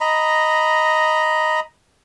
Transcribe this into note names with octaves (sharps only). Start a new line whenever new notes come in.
D#5 A#5 B5